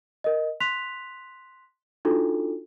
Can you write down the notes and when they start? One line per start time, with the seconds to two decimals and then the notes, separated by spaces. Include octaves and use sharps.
0.24 A#4 D#5
0.60 C6 F#6 B6 F7
2.05 D4 D#4 F4 F#4 A4